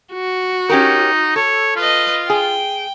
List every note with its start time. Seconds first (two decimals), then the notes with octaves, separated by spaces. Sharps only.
0.13 F#4
0.69 C#4 D#4 G4 A#4
1.36 A4 C#5
1.76 F4 B4 D#5
2.30 G#4 G5